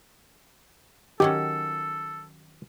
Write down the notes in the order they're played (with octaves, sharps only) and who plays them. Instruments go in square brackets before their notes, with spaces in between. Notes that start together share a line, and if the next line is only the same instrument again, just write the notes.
[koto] D#3 F#3 C#4 [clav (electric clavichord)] G4 [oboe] A4